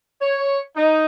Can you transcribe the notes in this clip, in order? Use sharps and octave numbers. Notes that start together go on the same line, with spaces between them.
C#5
D#4